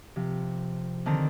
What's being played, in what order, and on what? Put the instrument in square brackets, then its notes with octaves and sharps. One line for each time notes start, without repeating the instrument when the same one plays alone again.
[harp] C3 F3
D3 D#3 C4 A5 A#5